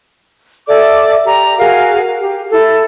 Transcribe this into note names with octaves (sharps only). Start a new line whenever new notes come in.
A4 D5 E5 D6
G4 A#5
F#4 G#4 A#4 F5
G4
E4 A4